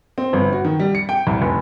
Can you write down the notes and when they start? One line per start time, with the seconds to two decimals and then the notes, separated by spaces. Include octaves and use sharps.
0.18 C4
0.33 G1
0.53 F#4
0.65 D#3
0.80 G3
0.95 C#7
1.09 G5
1.27 C2
1.42 F1